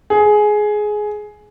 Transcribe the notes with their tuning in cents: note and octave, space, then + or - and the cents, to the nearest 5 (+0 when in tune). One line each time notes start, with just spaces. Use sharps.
G#4 +15